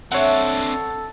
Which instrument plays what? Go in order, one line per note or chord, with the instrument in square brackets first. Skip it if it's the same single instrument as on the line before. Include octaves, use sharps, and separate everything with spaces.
[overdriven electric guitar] C4 D4 [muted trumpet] A4 [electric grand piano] C#5 F#5 [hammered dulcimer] E5